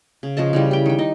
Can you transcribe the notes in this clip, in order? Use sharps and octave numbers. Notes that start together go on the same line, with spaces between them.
C#3
C#3 F3 D#5 A5
C#3 E3 G3
G4 G5
D#3 G5
D#4 D#5